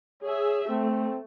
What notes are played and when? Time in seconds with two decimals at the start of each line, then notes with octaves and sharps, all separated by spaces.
0.22 G#4 C#5 E5
0.69 A3 C4